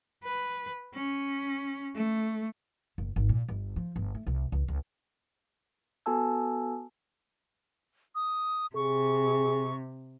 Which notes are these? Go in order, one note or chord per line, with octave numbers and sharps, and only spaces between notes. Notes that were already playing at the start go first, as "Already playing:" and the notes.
B4
C#4
A3
F#1
G#1
A#2
G1
F3
G1
A3
C2
C#2
C#2
B3 F#4 A4 G#5 A5 E6
D#6
C3 G#4 C#6